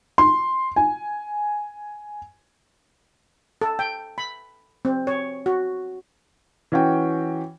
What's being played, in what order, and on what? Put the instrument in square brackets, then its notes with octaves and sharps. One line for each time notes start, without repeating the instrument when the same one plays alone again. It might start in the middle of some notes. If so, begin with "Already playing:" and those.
[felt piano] C6
G#5
[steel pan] A4
G5
B5
C4
C#5
F#4
[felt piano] E3 C#4 F#4 G5